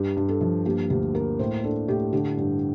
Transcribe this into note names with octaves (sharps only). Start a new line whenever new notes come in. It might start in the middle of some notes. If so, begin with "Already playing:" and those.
Already playing: G2 G4
G2
A4
F3
A#3 G4
D2 G4
A#3 A#4
A2 C5
D4 A4
A2 G4
D3 G4
G2